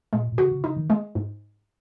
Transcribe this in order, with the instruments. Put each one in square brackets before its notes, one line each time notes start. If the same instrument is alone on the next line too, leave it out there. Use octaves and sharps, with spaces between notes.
[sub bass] A#2 [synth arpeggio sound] G#3
[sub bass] A#2
[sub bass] C#3 [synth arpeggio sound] F#4
[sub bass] C#3
[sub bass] C#3 [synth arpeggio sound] D#4
[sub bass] D#3
[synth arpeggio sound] G#3
G#2